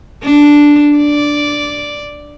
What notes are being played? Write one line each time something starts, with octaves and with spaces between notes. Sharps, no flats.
D4
D5